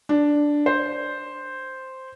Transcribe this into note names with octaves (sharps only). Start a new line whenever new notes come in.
D4
C5